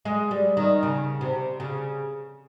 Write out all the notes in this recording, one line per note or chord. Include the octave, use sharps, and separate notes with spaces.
G#3
G3
D#3
C#3
C3
C#3